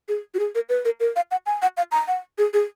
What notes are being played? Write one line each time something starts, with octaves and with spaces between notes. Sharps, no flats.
G#4
F#4
G#4
A#4
B4
A#4
A#4
F5
F#5
G#5
F#5
F5
A#5
F#5
G#4
G#4